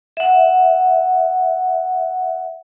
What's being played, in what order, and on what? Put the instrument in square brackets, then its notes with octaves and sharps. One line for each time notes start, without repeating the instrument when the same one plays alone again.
[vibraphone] E5 F#5